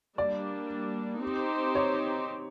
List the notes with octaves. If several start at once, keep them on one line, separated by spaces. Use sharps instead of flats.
G3 A#3 D4 D5
C4 D#4 G4 C5
C#5